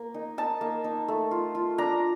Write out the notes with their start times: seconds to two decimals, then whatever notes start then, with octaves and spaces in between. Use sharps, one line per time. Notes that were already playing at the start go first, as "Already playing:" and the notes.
Already playing: A#3
0.14 D#4
0.38 D#4 A5
0.61 A#3
0.84 D#4
1.08 A3
1.31 F4
1.55 F4
1.78 D4 A#5